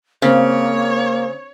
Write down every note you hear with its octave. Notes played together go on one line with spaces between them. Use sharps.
C#3 A#3 C4 C#5